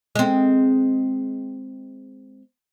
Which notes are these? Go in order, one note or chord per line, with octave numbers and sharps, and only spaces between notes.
G#3 C4